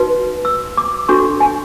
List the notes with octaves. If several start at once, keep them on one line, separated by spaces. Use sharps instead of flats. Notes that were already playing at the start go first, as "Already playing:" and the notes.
Already playing: D#4 F#4 B4
E6
D6
D4 F#4 A4 C#6
G#5